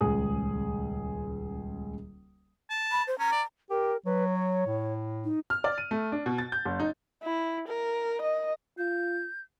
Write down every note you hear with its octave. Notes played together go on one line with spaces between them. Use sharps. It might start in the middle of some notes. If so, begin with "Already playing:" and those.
D#1 C#2 G#4 D#6
A5
B5
C5
C#4 A#5
D5
G4 A#4
F#3 B4
C#5
A2
D#4
F6
D5
D#7
A3
D4
B2
A6
G6
F#1
D#4
E4
A#4
D#5
F4 G6